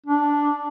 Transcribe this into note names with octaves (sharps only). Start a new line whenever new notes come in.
D4